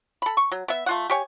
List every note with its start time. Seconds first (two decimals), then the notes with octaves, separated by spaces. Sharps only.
0.22 A4 B5
0.37 C#6
0.52 F#3
0.68 B3 E5
0.86 A3 F4 F#5
1.10 G4 C#5 G#5